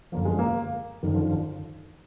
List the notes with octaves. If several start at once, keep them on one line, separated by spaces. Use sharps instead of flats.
F#2 D3 F3 A#3
G#3
A#3
F#2 D3 D#3 F3